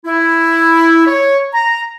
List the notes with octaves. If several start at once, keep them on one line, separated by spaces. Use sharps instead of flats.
E4
C#5
A#5